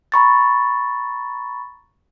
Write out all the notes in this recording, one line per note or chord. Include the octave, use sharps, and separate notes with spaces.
A#5 B5 C#6 A6